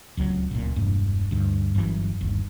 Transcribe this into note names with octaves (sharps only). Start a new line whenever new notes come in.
D1 C#2 F#3
D1 C#2 A#2
E1 G2 A#3
D2 G2
G1 F#2 C#3 E3
G1 D#2